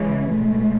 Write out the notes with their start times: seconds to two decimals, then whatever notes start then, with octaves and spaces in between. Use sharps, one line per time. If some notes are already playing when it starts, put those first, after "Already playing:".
Already playing: C#3 E3 G#3
0.27 B2 G#3 A3